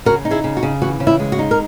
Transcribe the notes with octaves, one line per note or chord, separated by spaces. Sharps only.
C#3 F#4 A#4
D#4
E4 G#4
C#3
F#4
C#3
E3 F#4
C#3
E4
G#3
F#4
D#4
A#4